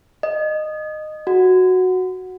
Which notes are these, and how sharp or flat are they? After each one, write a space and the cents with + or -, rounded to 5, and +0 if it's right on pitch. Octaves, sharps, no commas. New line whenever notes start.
D#5 -15
F#4 -5